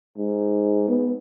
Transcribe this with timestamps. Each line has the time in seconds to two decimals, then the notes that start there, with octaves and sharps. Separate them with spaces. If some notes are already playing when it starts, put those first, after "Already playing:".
0.18 G#2
0.89 B3